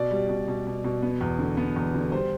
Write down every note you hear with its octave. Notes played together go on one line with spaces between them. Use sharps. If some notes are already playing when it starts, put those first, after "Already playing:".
Already playing: B2 D5
G3
B2
B2
B2
B2
B3
E2
D3
B3
E2
D3
G3 C5